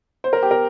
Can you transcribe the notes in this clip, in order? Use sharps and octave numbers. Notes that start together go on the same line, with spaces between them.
C5
A#4
G4
A#4